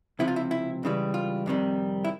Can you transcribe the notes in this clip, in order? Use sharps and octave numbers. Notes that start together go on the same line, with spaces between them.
C#2 C3 F3 E4
F4
E4
E4
C#2 C#3 E3 G3
F4
F2 C3 D#3 G3
E4